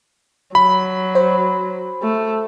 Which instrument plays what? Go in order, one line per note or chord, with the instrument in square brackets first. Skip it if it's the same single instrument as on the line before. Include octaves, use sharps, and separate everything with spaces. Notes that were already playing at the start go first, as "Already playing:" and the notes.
[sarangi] F#3 [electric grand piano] B5
[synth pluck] C5
[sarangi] A3